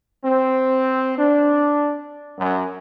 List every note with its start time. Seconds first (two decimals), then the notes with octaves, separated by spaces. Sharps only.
0.24 C4
1.18 D4
2.39 F#2